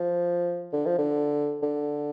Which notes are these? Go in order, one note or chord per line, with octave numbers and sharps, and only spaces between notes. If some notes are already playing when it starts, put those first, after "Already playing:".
Already playing: F3
D3
F3
D3
D3